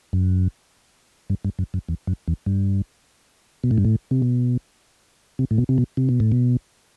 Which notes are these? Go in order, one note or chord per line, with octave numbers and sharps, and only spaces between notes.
F#2
G2
G2
F#2
F#2
E2
F#2
E2
G2
B2
A2
G2
A2
C3
B2
C3
A2
B2
C3
B2
C3
B2
A2
B2